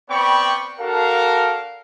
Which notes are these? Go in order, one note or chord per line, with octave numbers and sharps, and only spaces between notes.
B3 C4 D5 G5 B5 C#6
D4 F#4 A4 A#4 F5